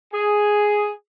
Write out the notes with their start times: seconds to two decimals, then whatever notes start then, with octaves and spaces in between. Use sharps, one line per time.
0.13 G#4